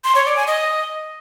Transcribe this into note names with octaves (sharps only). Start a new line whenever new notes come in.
C6
C#5
D5
G#5
D#5